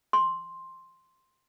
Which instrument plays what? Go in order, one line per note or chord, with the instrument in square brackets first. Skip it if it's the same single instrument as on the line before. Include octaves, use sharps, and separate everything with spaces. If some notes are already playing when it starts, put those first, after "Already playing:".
[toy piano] C6